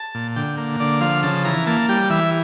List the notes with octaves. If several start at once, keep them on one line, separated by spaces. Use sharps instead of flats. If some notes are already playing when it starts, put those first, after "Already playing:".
Already playing: A5
A#2
D3 G5
A#3
D3 D5
F3 F5
C#3 A5
E3 A#5
A#3 A5
G3 G5
E3 E5